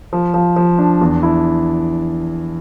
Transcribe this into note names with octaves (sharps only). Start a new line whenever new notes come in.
F3
F3
F3
D4
E2
E4